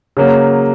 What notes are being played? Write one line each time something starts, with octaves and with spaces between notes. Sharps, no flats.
C#3 F#3 A#3